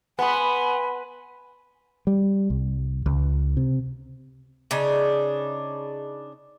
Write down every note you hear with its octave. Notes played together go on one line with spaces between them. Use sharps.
B3 G#5 B5 C6
G3
C2
C#2
C3
C#3 D4 D#4